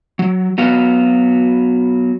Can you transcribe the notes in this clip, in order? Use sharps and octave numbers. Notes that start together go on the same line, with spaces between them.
F#3
F#3 B3 F#4 B4 F5